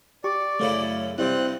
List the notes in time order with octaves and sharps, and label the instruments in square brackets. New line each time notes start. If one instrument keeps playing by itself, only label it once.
[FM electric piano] G4 C#6 [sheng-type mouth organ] D5
[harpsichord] F#2 C#3 E4 [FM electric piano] A3 C#5
[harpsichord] G2 C3 [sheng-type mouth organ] C4 F#6 [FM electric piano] E4